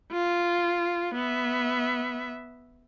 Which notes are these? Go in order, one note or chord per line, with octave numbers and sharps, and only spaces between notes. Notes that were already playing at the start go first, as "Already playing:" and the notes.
F4
B3 E5